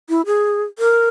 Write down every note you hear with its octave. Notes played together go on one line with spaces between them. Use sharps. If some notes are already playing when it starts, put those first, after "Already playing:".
E4
G#4
A#4